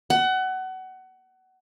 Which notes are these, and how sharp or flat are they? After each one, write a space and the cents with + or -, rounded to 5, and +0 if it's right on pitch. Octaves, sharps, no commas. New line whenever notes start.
F#5 +25